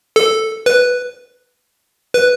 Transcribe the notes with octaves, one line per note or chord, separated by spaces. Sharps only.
A4
B4
B4